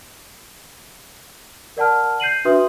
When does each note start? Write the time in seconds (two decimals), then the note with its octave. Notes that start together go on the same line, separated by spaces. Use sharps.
1.77 A#4 D5 F#5 A5 F6
2.20 G6 C7 D#7 F#7
2.45 D4 F#4 B4 E5 C6 D#6